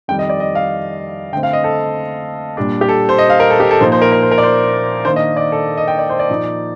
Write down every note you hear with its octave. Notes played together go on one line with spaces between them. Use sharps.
F2 D#3 G3 G5
D#5
D5
D#5
F5
D3 A3 C4 G5
F5
D#5
A4
A#2 G3 D4
G4
A4
C5
D#5
F5
A#4
A4
G4
A4
A#2 F3 A#3 D#4 C5
C5
A#4
A#4
C5
A#4
D5
C5
D#3 A#3 D4 C5
D#5
D5
A4
D#5
G5
D5
C5
D5
A#2 F3 A#3 D#4